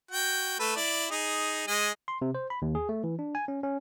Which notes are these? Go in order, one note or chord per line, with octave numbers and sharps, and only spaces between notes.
F#4 G5
A3 A4 B4
E4 D5
D#4 G#4
G#3 D#5 G#5
C6
C3
C5
B5
D#2
G#4
A3
E3
D4
G#5
C#4
C#4